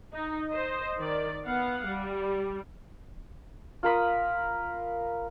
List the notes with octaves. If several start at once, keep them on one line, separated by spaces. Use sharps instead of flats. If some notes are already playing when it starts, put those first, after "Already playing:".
D#4
C5 D#5
D#3 D5
B3 F5 F#5
G3
F4 A#4 B5 D#6